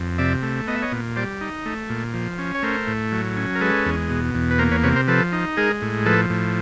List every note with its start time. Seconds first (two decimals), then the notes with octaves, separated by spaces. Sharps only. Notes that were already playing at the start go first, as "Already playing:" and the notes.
Already playing: F2
0.18 C3 D5 E5
0.43 A3
0.67 B3 D#5
0.75 E5
0.82 C#5 D#5
0.92 A#2
1.16 G3 C5 D5
1.41 D#4
1.66 A3
1.90 A#2
2.14 F3
2.38 C#4
2.55 C#5
2.63 A3 A#4 C5
2.87 A2
3.12 F#3
3.37 C#4
3.55 A#4
3.61 G#3 A4 B4
3.86 E2
4.10 B2
4.34 E2
4.51 B4
4.58 A#3 A#4 C5
4.71 B4 C#5
4.84 C3 B4 C#5
4.96 A#4 C5
5.08 F3 A4 B4
5.32 D#4
5.57 G#3 G#4 A#4
5.82 A2
6.06 F3 A4 B4
6.30 A2